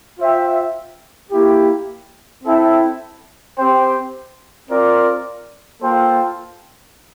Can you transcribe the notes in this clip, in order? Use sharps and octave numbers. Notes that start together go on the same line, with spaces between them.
F4 C5 E5 G5
A#3 E4 G4
C4 E4 A4 E5 G5
C4 G4 C5 G5
C4 F4 A#4 D5
A#3 F4 A4 C5 G5